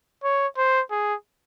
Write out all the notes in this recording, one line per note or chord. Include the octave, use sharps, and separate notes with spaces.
C#5
C5
G#4